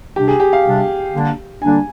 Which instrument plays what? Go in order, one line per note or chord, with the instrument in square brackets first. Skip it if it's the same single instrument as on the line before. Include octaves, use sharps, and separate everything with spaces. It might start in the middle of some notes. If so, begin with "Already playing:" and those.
[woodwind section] C3 G3 D4 [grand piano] G4
[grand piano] G#4
G4
F5
[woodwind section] C3 G3 D4
D3 G3 A#3 D4
[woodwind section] D3 G3 A#3 D4 [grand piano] G#5